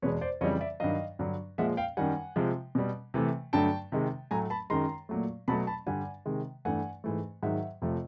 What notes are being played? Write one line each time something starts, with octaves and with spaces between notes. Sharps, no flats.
E2 B2 G#3 B4 C#5
C5 D5
F2 C#3 E3 G3 C#5 D#5
D5 E5
G2 D#3 F#3 D#5 F5
G2 D3 F#3
A#2 F3 G#3 E5 F#5
F5 G5
F#2 D#3 G3 F#5 G#5
C3 F3 G#3
B2 G3
C3 E3 A3
G2 D3 F#3 A3 G5 A5
C3 D#3 G#3
A2 F#3 A3 G#5 A#5
A5 B5
F#2 D#3 G#3 A#5 C6
A#2 F#3 A3
B2 F#3 A3 A5 B5
A5 B5
G2 D3 G3 F#5 G#5
C3 D#3 G#3
G2 E3 A3 F#5 G#5
G#2 E3 A3
G#2 D#3 F#3 E5 F#5
F2 C3 F3 A3